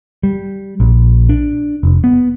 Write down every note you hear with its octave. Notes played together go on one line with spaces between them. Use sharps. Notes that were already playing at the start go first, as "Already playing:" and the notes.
G3
A#1
D4
F1
B3